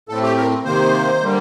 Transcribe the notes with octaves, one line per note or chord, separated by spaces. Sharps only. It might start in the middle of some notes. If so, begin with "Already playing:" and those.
A2 A3 C4 A4
G4
A#4
C3 D#3 A#3 C5
D3 G3 A#3